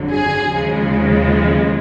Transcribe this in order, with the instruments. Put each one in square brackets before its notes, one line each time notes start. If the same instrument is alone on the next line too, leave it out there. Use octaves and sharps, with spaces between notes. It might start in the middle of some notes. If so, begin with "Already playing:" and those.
Already playing: [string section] G1 F2 D3 F#3
G#4
D#2 C#3 F3 G#3